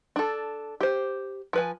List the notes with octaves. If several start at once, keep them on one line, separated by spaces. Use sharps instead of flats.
D4 A4
G4 C5
F3 B4 G#5